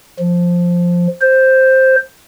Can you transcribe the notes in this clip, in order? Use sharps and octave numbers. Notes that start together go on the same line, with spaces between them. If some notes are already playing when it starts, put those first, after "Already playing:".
F3
C5